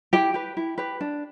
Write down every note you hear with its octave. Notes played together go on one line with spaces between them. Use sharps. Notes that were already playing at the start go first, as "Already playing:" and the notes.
E4 G4 G5
G4 B4
E4
G4 B4
D4